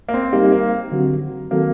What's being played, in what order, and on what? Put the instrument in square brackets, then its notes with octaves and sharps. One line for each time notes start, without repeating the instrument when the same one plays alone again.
[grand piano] A#3
C4
[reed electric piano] G3 C4 D#4 G4 [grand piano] A#3
[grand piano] A#3
[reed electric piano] D3 F#3 C4 F#4
[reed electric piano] D#3 F#3 C4 F#4 A4 [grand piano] A#3